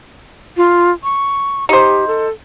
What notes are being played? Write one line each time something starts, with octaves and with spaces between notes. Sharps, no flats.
F4
C#6
D#4 G4 C5
A4